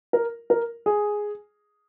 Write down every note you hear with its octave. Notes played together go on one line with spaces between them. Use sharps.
A#4
A#4
G#4